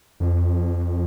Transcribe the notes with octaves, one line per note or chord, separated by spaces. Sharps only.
F2